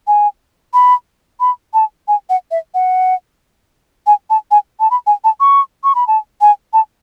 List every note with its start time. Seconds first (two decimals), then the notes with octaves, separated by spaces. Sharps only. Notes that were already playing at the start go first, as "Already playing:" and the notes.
0.07 G#5
0.74 B5
1.40 B5
1.74 A5
2.08 G#5
2.29 F#5
2.51 E5
2.74 F#5
4.07 G#5
4.30 A5
4.51 G#5
4.80 A5
4.91 B5
5.07 G#5
5.24 A5
5.40 C#6
5.84 C#6
5.95 B5
6.07 A5
6.41 G#5
6.73 A5